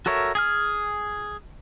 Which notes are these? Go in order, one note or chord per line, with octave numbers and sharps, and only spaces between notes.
F#4 A4 A#4 C#5 E5
G#4 G#5 F6